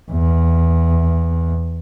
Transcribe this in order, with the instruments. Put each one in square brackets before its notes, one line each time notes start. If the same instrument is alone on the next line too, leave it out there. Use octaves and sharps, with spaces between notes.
[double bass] E2